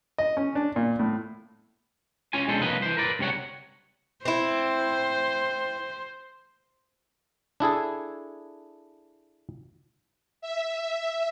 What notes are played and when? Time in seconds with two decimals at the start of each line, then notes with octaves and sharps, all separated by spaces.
0.18 D#5
0.37 C#4
0.55 D4
0.76 A#2
0.99 A2
2.33 C#4 F4 G#5
2.48 C#2 B2 G#3 D4 A4 C5
2.61 C2 F2 A#3 B4 D#5
2.82 E3 C5
2.97 A#4 B4 D5
3.19 C#2 C3 G3 C#5 F#5
4.25 C4 E4 C5
7.60 D4 E4 G#4 A4
10.42 E5